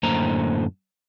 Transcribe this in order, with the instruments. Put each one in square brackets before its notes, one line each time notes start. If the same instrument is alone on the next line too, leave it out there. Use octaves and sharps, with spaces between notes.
[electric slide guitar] F#2 A2 D3 A#3 C5 A#5